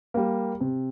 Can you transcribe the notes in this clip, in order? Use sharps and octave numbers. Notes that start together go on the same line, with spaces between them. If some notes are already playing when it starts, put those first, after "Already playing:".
G3 A#3
C3